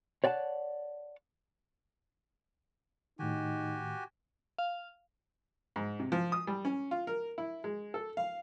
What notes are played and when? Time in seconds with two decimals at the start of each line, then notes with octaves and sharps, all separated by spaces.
0.24 C#5 D5 F#5 G5 A5
3.19 A2 D#3 D#4 F#4 G4 G#5
4.58 F5
5.76 G#2
5.99 C3
6.12 F3
6.32 D#6
6.47 G3
6.65 C#4
6.91 F4
7.07 A#4
7.38 E4
7.64 G#3
7.94 A4
8.17 F5